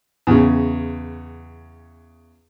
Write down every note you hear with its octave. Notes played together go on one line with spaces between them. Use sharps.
E2 C#3